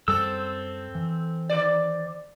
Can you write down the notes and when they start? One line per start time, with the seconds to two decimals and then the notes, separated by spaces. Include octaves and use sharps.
0.08 F#2 G3 C4 A4 E6
0.95 E3
1.49 D#3 D5